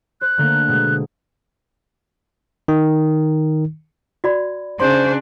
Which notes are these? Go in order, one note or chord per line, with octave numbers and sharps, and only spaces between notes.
C5 F#6
D3 A3 A#3
B2 G#3
D#3
F#4 D5 B5
C#3 D4 C5 C6